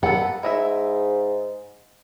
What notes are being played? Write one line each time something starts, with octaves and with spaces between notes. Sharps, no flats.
A#3 B3 A4 F#5
G#2 E4 D#5 E5